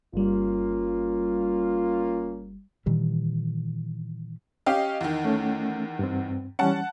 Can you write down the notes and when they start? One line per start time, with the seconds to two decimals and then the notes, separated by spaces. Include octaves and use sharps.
0.14 G1 G3 A#3 C#4 F4
2.86 A#2 D#3 E3 G3
4.66 C#4 G4 D#5 F5
5.01 E2 D#3
5.25 A3 C#4
5.99 G2 C4
6.59 E3 G3 C#4 F#5 A5